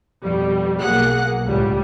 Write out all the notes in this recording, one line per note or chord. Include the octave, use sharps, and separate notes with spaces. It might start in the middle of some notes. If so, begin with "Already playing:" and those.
F2 B2 G3
B1 A#3 G#4 F#5 F#6
C#2 A2 G3